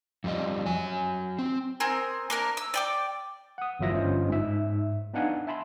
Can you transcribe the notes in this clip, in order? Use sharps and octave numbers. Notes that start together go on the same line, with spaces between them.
F2 G3 D#5
F#3 G#5
C4
C4 G#4 A#4
A#3 D4 A#4
E6
D5 G5 D6
F#5 D#6
G1 E3 F#3 F4 E5 A#6
G1 G2 C#4 F4 C5 D#5
G#2 E5
B3 D4 D#4 F5 F#5 G#5
E5 G#5 A5 B5 C6